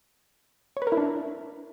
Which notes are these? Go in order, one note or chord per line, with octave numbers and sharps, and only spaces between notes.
C#5
B4
A#4
E4
D4